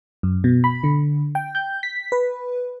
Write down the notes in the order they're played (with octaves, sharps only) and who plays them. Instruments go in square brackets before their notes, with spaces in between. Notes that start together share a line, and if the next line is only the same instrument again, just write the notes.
[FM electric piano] F#2
B2
B5
D3
G5
G6
B6
B4